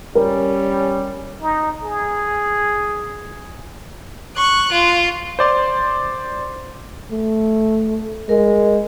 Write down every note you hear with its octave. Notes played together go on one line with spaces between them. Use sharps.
G3 C#4 A#4
D#4
G#4
C#6 F#6
F4
C5 D5 C6
A3
G#3 A#4